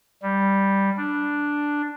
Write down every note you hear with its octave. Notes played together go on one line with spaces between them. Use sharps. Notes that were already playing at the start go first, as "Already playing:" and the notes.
G3
D4